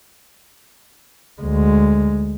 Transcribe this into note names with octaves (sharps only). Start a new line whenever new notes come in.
D2 G#3